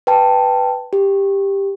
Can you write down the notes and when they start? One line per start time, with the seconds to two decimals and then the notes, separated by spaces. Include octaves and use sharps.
0.07 B4 G5 A5
0.93 G4